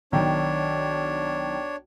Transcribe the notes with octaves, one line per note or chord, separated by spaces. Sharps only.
B1 D#3 D4 C#5 G5